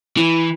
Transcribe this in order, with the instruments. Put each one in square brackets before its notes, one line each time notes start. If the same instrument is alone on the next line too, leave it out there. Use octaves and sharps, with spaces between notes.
[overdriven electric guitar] E3